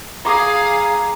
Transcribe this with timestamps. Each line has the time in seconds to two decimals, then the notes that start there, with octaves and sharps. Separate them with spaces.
0.25 G#4 F5 A#5 D6 D#6